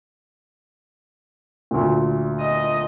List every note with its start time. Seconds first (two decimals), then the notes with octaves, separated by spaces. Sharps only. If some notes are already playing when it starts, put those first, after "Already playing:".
1.71 D2 A#2
2.41 D#5